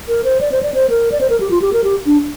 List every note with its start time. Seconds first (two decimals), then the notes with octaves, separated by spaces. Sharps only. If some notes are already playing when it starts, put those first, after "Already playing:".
0.08 A#4
0.24 C5
0.41 D5
0.52 C5
0.63 D5
0.74 C5
0.90 A#4
1.12 D5
1.21 C5
1.30 A#4
1.40 G4
1.51 F4
1.62 G4
1.73 A#4
1.84 G4
2.06 D4